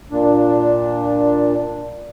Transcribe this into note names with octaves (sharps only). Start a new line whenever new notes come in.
A#2 D4